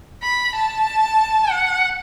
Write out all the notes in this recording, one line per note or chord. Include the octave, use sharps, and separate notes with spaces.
B5
A5
F#5